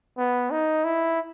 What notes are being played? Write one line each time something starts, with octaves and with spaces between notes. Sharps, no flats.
B3
D#4
E4